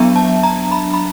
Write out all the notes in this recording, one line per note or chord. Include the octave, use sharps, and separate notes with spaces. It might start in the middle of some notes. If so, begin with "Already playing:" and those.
Already playing: F#3 B3 D4 E5
A5
A#5
B5
B5